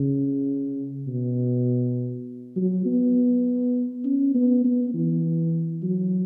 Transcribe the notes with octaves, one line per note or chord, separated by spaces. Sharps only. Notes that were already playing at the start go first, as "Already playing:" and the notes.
Already playing: C#3
B2
F#3
B3
C#4
B3
B3
E3
F#3